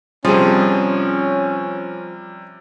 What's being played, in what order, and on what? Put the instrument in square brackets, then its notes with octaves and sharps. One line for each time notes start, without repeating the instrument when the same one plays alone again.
[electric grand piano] C3 G3 [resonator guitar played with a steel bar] F3 G#4 [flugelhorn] C#4